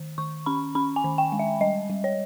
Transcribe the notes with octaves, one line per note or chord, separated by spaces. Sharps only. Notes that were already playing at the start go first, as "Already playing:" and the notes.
Already playing: D#3
D#3 C#6
C#4 B5
C#4 B5
G#5
D#3
G5
G#3
E5
G3 D#5
G3
C#5